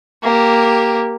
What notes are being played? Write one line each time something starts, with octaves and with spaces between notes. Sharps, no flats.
A#3 G4